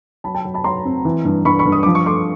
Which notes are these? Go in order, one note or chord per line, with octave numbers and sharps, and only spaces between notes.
F#3 A5 B5
G5 A5
F#3
A5 B5
F#3 A#5 C6
C4
E3
G2
G2 B5 C#6
B5 C#6
G2
D#6
F3 D6
C#6
A3 C6 D6